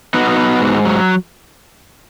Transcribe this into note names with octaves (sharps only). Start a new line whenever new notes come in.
B3 D#4 F#4
B3
G#2
F#3